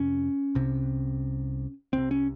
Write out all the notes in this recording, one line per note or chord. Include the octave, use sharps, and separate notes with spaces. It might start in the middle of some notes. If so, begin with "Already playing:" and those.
Already playing: F2 C3 C#4
C2 C3
C2 C3 C4
C#4